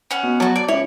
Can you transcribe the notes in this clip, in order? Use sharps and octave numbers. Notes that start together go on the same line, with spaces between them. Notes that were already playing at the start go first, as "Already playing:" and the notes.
C#4 F#5
B2
F#3 F#4 A5
D5
C#2 E4 C#5